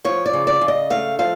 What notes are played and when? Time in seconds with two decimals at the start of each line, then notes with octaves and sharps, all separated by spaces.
0.05 F3 C#5
0.26 D5
0.33 C#3
0.47 D5
0.61 C#3
0.68 D#5
0.90 A3 F5
1.19 F3 F5